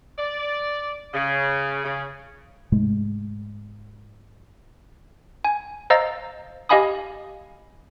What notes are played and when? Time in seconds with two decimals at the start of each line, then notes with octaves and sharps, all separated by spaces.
0.19 D5
1.14 C#3
1.85 C#3
2.72 G#2 C3 G#3 A3
5.44 G#5
5.90 C5 D#5 F5 A#5 E6 A6
6.69 G4 D#5 F5 G#5 B5 D#6